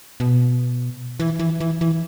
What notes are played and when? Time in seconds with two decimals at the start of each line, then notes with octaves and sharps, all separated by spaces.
0.20 B2
1.20 E3
1.39 E3
1.60 E3
1.81 E3